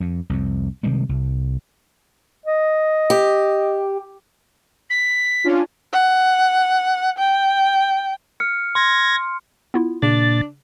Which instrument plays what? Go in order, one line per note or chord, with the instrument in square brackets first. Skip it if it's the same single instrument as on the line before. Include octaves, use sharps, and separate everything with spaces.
[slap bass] F2
C2 F2
C3 D#3 G3 G#3
C2
[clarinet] D#5
[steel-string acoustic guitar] G4
[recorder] B6
[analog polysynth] C#4 D4 F4
[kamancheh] F#5
G5
[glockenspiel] F6 C#7
[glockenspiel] C6 [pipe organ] G#6 A#6
[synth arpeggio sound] B3 E4 F4
[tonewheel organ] A#2 A6 [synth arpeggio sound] C#3 [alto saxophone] D4